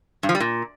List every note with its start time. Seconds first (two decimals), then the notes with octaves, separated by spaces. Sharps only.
0.23 G2
0.29 F3
0.35 G3
0.40 A#2